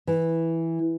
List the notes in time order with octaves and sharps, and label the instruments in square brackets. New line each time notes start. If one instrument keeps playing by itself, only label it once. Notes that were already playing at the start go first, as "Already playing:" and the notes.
[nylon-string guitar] E3